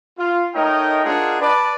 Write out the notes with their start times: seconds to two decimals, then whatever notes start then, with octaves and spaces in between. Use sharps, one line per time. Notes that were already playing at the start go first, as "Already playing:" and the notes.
0.18 F4
0.55 A3 D#4 A#4 C#5 D#5 G5
1.04 D4 F4 G#4 A#4 D#5 F#5
1.40 B4 D5 A5